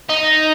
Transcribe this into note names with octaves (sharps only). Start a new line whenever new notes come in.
D#4